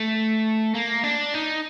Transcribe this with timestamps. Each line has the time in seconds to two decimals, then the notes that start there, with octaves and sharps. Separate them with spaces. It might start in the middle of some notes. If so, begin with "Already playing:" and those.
Already playing: A3
0.75 A#3
1.04 D4
1.34 D#4